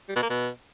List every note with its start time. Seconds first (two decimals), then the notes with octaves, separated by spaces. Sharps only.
0.09 G3
0.16 B2
0.23 A#3
0.30 B2